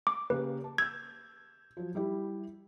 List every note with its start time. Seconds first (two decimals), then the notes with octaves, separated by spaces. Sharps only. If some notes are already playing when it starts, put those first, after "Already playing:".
0.07 D6
0.30 C#3 A#3 G4 B4
0.64 A5
0.78 E6 G6 G#6
1.77 F3 F#3
1.95 G3 E4 G4